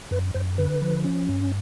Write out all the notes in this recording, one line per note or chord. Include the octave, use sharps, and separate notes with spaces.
F#2 B4
F#2 C5
D3 B4
F3
C#4
G2